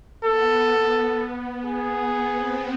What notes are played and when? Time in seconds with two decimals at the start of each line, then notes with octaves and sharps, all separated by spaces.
0.23 B3 A4
1.64 G#4
2.35 C4